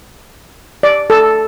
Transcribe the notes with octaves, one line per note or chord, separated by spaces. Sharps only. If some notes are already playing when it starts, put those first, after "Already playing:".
D5
A4